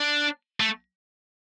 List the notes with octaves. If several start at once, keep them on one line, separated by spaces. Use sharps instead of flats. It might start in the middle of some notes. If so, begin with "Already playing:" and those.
Already playing: D4
A3